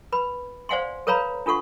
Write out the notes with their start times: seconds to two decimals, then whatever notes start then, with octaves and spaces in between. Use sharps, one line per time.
0.12 B4 B5
0.69 C5 D5 F5 F#5 G#5 C6
1.07 A4 B4 C#5 F5 A#5 B5
1.46 D4 F4 A4 F#5 C#6